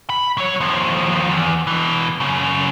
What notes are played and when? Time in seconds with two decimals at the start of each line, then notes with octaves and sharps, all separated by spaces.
0.10 B5
0.38 F#3 C#5
0.60 D#2 F3
1.31 E2
1.67 B2 E3
2.20 F#2 C#3